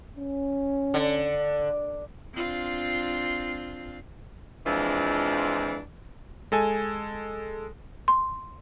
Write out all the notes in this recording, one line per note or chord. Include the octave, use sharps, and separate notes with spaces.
C#4
D3
C4 D4 F4
F2 E3 F3 G#3 D4
G#3 A4 G#5
C6